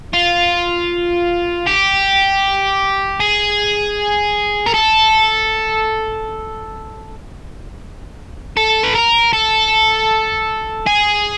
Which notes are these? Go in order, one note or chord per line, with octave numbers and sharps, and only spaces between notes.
F4
G4
G#4
A#4
A4
A4
B4
A#4
A4
G#4